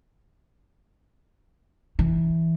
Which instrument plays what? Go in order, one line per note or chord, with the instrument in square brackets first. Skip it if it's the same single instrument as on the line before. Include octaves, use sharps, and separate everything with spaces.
[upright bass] E3